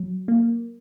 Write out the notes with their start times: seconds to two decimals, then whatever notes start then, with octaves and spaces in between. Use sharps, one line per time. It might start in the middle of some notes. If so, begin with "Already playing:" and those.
Already playing: F#3
0.28 A#3